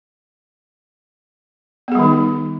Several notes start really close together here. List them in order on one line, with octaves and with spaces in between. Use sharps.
B3 G#4 G3 D#3 D#4